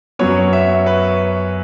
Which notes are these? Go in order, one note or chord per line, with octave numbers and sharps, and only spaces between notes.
F#2 F#3 B3 C#5
E5
B4